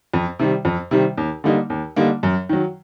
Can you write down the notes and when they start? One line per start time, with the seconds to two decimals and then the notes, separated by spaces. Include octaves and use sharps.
0.14 F2
0.39 C3 D#3 G3
0.65 F2
0.91 C3 D#3 G3
1.17 D#2
1.44 D3 G3 A#3 D#4
1.70 D#2
1.96 D3 G3 A#3 D#4
2.23 F#2
2.49 D#3 F#3